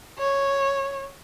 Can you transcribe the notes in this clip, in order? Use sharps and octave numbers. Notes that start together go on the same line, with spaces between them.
C#5